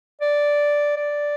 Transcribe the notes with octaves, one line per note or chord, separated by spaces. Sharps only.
D5
D5